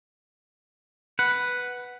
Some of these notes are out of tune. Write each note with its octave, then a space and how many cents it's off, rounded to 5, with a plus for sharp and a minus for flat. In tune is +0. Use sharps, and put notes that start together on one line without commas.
B4 +0 F#5 +0